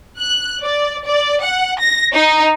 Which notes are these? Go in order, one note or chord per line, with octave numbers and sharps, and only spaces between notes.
F#6
D5
D5
F#5
A#6
D#4